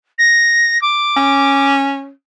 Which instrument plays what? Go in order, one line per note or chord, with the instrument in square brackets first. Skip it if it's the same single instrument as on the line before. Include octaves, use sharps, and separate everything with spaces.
[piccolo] A#6
D6
[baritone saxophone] C#4